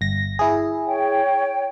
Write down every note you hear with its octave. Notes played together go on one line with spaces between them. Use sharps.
G1 A#6
E4 G#4
C#5 G5